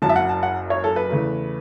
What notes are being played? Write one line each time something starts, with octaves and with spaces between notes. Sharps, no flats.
F#1 F#2 F#3 A5
E5
F#5
A5
F#5
C#5
A4
B4
E2 C#3 A3